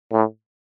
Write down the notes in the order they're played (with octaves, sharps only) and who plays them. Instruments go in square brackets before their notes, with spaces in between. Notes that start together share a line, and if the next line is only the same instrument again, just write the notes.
[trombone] A2